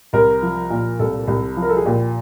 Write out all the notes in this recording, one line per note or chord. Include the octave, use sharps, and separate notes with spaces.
C2 A#4
F3
A#2
C2 A4
C2
F3
A#4
A4
G#4
A#2 G4